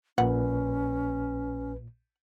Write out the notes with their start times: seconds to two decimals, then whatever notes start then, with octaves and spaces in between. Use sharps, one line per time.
0.18 A#1 A#2 C#4 B4 F#5